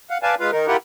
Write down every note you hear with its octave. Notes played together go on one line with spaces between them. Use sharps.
F5 F#5
B4 D5 F5 G#5 A5
G#3 F4 B4 F5
D#3 D#4 A#4
E4 F4 G4 A#4 F#5